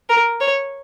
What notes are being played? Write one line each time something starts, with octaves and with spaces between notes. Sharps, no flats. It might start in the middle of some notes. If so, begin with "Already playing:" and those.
A#4
C#5